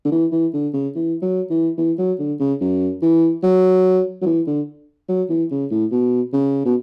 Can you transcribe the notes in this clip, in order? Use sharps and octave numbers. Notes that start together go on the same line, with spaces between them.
D3
E3
E3
D3
C#3
E3
F#3
E3
E3
F#3
D3
C#3
F#2
E3
F#3
F#3
E3
D3
F#3
E3
C#3
A2
B2
C#3
B2